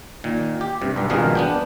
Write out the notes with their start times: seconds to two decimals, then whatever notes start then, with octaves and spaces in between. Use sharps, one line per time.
0.24 A#2 D#3
0.61 G4
0.81 G2 C3
0.96 B1 G2
1.10 G#1 G2 B2 F3 G#4 A#4
1.35 B3 D4 G5